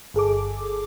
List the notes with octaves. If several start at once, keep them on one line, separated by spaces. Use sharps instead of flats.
G1 G#4 A4 D6